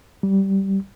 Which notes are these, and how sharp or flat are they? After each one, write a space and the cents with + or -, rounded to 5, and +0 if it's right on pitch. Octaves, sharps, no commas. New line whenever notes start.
G3 -15